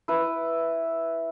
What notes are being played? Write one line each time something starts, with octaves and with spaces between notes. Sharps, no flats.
E4 B4